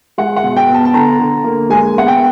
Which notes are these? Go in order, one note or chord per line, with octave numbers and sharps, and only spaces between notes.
G#3 F#5
F#5
B2
G5
B3
A5
A5
D3 A#5
D3
A#3
G#3 G#5
B3 F#5
G5